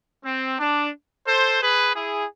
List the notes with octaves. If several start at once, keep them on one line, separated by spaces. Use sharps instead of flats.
C4
D4
A4 C5
G#4 B4
E4 G#4